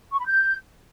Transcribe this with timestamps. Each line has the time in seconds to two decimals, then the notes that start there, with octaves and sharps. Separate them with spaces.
0.12 C#6
0.19 B5
0.27 G6